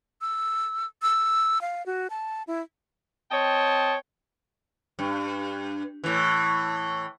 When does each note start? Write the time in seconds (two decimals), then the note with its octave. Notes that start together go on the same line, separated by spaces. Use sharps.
0.21 E6
1.02 E6
1.61 F5
1.86 F#4
2.10 A5
2.47 E4
3.31 C4 C#5 D#5 G5 A5
4.99 G2
6.04 A2 E3